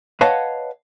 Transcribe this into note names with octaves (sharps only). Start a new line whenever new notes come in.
B4 C#5 D#5 F5 F#5 A5